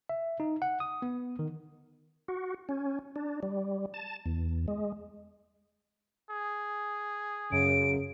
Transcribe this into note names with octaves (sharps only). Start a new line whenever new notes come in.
E5
D#4
F#5
D#6
B3
D#3
F#4
C#4
D4
G3
A5
E2
G#3
G#4
F#2 C#3 D7